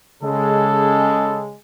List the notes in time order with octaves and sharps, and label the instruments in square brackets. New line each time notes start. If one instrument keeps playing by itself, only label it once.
[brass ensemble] C#3 G#3 [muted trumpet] A4